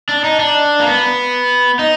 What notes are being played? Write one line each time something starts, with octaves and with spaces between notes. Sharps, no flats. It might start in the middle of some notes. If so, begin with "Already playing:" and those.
D4
D#4
D4
A#3
B3
D#4